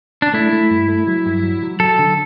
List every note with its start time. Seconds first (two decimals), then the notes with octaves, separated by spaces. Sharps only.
0.22 D4
0.34 A3 E4
0.53 A3
0.70 G2
0.88 A3
1.07 F#3
1.26 G2
1.43 F#3
1.63 F#3
1.80 F#3 A4
1.99 D3